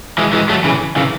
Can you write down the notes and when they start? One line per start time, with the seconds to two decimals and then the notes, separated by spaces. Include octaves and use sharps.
0.18 E3 G#3
0.33 E3 G#3
0.49 F#3 A3
0.64 C#3 E3
0.96 C#3 E3